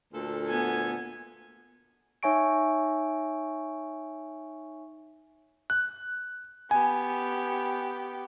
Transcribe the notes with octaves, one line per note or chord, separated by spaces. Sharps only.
D2 A#2 A4
B3 G#5
D#4 C#5 E5 G#5 C#6 D7
F#6
B3 G4 G#5